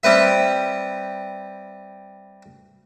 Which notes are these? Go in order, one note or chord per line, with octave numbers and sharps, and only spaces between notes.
G3 C4 B4 E5